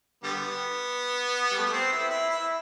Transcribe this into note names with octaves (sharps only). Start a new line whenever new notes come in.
D3 G3 B3
G3
A3
B3
C4
E4
E4
E4